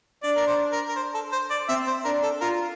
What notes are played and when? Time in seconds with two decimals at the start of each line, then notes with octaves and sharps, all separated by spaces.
0.23 D4 D5
0.37 A#4
0.47 C5
0.72 A#4
0.89 A#4
0.96 C5
1.15 A4
1.33 C5
1.51 D5
1.69 C4 E5
1.88 C5
2.05 D4 A#4
2.23 A4
2.41 F4 A#4